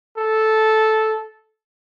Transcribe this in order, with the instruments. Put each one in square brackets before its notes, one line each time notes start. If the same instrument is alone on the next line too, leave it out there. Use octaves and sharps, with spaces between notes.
[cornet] A4